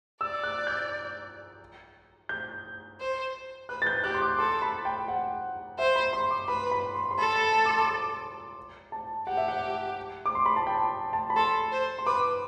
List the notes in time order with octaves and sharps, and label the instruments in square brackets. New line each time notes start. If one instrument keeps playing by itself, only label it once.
[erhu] D5 [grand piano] E6
[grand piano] F#6
G6
G6
[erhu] C5
[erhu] B4 [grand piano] F#6
[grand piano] A6
G6
[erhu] G4 [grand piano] F#6
[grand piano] C6
D6
[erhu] A4 [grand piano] C6
[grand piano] B5
G5
F#5
[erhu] C5 [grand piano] E5
[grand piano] B5
C6
D6
[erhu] B4 [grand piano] B5
[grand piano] B5
C6
C6
[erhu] A4 [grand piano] B5
[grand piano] B5
B5
D6
C6
D6
A5
[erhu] G4 [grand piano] F#5
[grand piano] E5
F#5
D6
C6
B5
A5
G5
A5
B5
[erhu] A4 [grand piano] C6
[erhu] C5
[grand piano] C6
[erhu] B4 [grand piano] D6